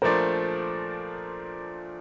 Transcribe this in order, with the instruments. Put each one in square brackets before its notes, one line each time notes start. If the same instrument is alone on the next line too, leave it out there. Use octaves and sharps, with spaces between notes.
[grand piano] A#2 F3 A3 D4 [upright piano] A#4 C5